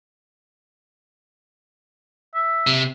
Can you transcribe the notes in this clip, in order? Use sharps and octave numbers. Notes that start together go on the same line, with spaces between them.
E5
C3